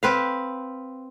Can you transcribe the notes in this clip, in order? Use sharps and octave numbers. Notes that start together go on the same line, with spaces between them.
C4 B4 F5